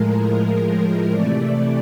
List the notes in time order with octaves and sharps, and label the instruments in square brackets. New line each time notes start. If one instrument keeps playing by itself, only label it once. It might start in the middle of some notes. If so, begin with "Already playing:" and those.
Already playing: [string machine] A2 F3 G#3 A#4
C3 E3 A3 D5